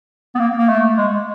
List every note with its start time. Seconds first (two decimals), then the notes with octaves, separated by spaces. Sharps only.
0.35 B3
0.39 A#3
0.58 A#3
0.69 A3
0.97 G#3